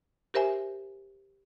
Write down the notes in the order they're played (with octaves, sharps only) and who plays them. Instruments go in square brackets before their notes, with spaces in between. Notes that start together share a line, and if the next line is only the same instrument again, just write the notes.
[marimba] G4 A#4 C5 E5 G#5